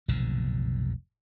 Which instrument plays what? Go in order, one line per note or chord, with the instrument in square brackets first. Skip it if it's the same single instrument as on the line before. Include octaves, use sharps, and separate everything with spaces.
[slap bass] F1 B1 A#2 D3